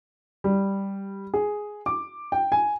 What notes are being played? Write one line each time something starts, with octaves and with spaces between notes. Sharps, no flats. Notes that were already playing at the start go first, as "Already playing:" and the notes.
G3
G#4
D6
G5
G#5